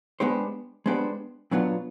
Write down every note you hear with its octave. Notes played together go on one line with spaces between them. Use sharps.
G#3 B3 D4 G4 C5
G#3 B3 D4 G4 C5
A#2 F#3 B3 D4 F4